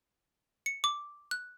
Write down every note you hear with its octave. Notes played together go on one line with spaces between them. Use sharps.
C#7
D6
F#6